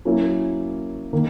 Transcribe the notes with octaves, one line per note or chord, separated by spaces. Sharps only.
F#3 A#3 C#4 E4
D#3 A#3